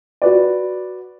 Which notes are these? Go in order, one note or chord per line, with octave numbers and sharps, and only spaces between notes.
F#4 B4 D5